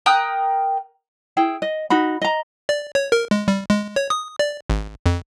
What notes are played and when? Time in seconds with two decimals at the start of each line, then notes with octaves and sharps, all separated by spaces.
0.06 A#4 G5 D#6 F#6
1.37 E4 G#4 G5
1.62 D#5
1.90 D#4 F#4 B5
2.22 D#5 A#5
2.69 D5
2.95 C#5
3.12 A#4
3.31 G#3
3.48 G3
3.70 G#3
3.96 C#5
4.10 D#6
4.39 D5
4.70 G#1
5.06 F2